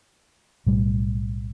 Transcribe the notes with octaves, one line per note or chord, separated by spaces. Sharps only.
B1 A2 G3